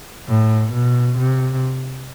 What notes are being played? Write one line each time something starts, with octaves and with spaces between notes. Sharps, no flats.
A2
B2
C3